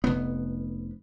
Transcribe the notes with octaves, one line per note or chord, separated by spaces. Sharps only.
F1 B3